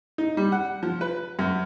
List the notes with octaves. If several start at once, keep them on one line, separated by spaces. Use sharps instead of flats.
D#4
G3
F#5
F3
B4
F#2